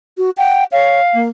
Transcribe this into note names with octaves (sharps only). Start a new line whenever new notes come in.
F#4
F#5 G5
C#5 F5
A#3